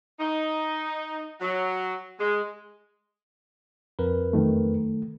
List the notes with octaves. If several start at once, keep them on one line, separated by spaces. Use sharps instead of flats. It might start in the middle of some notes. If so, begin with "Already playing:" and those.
D#4
F#3
G#3
F2 A#4 B4
F#2 D#3 A3